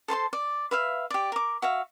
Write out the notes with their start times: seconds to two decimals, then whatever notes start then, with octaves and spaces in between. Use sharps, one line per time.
0.08 A4 C5 A5 C6
0.33 D5
0.71 B4 E5 F5
1.10 G4 D5
1.32 A#4 D6
1.62 F#4 E5 F5